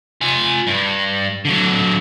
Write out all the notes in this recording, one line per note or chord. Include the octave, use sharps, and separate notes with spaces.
F4 G#5
G2
D3 F#3